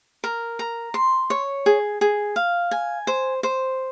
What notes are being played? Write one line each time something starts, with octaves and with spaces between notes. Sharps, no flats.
A#4
A#5
C6
C#5
G#4
G#4
F5
G#5
C5
C5